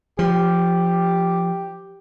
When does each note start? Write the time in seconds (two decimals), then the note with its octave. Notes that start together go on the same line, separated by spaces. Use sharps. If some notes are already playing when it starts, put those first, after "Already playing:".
0.19 F3 G4